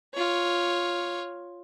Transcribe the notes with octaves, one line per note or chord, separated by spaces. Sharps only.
F4 C#5